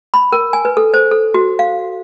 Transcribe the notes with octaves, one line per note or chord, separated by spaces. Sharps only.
B5
A#4
G#5
B4
A4
C5
A4
F#4
F5